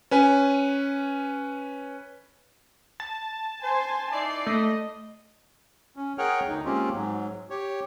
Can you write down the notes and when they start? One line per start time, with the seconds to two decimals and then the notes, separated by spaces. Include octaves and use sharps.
0.11 C#4 B4 G#5
3.00 A5
3.63 C5 G#5 C6
4.12 D#4 E4 D5 C7
4.47 A3 D#5
5.96 C#4
6.18 G#4 A#4 C#5 F#5 G5 F6
6.48 D2 D#4
6.65 G#3 A#3 C4 C#4 F4 G4
6.93 G#2 F#3
7.50 G4 C#5